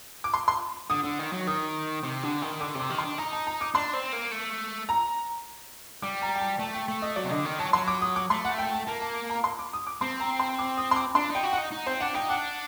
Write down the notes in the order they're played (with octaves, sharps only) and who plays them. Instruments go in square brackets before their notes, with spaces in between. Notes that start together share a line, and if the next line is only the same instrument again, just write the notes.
[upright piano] D6
C6
C6
[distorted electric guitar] D3 [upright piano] D#6
[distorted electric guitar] D3
D#3
F#3
[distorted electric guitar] D#3 [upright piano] D#6
[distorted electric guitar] C3
D3
D#3
[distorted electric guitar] D3 [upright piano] D6
[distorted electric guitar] C3 [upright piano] D6
[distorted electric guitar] D#3
[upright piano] C6
[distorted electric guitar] D4
[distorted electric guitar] D#4 [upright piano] A#5
[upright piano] A5
A#5
D6
[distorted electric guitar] D4 [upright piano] C6
[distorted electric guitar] C4
A#3
A3
[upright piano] A#5
[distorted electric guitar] G3 [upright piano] D6
[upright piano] A#5
G5
A5
[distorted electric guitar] A3 [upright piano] A5
[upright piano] G5
[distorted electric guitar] A3
[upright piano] D#5
[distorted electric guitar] F#3 [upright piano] D5
[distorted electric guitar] C3
[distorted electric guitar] D3 [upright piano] D#5
[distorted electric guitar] D#3
[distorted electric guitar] F#3 [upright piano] A5
[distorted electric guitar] F#3 [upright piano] C6
[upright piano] D6
D#6
D6
[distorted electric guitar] A3 [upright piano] C6
[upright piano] F#5
G5
A5
[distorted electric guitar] A#3 [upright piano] A5
[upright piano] A5
A#5
C6
D6
D#6
D6
[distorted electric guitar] C4 [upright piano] C6
[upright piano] A#5
C6
D6
D#6
C6
D6
[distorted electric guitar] D4 [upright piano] C6
[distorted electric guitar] D#4 [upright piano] G5
[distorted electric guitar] F#4
[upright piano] F#5
[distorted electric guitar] D#4
D#4
[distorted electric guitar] C4 [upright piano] C5
[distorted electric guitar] D4 [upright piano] F#5
[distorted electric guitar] D#4 [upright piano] G5
[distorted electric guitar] D4 [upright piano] F#5